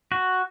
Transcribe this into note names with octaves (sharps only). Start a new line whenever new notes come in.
F#4